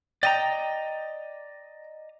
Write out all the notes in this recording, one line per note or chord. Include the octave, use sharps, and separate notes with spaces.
D5 D#5 G5 A#5